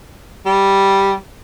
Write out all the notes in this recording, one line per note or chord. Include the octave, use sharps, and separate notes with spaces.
G3